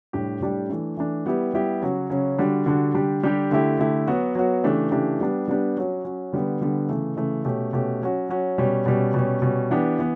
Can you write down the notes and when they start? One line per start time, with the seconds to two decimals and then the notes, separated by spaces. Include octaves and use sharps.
0.13 A2 G3 D4 G4
0.41 A2 G3 D4 G4
0.69 E3 A3 D4
0.97 E3 A3 D4
1.26 G3 B3 E4 G4
1.53 G3 B3 E4 G4
1.82 C#3 F#3 C#4 F#4
2.10 C#3 F#3 C#4 F#4
2.38 D3 G3 D4 F#4
2.66 D3 G3 D4 F#4
2.94 D3 G3 D4 G4
3.23 D3 G3 D4 G4
3.51 D3 A3 E4 G4
3.79 D3 A3 E4 G4
4.07 F#3 B3 F#4
4.35 F#3 B3 F#4
4.64 C#3 E3 A3 D4 G4
4.91 C#3 E3 A3 D4 G4
5.20 G3 B3 D4 G4
5.48 G3 B3 D4 G4
5.77 F#3 C#4 F#4
6.04 F#3 C#4 F#4
6.33 D3 G3 B3
6.61 D3 G3 B3
6.89 C#3 E3 A3
7.17 C#3 E3 A3
7.45 B2 A3 C#4 G4
7.73 B2 A3 C#4 G4
8.01 F#3 C#4 F#4
8.29 F#3 C#4 F#4
8.58 B2 G3 C#4
8.86 B2 G3 C#4
9.14 B2 G3 C#4
9.42 B2 G3 C#4
9.70 E3 B3 D4 G4
9.99 E3 B3